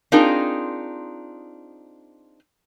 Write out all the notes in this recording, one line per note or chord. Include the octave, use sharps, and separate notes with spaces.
C4 D4 D#4 F4 G#4 A#4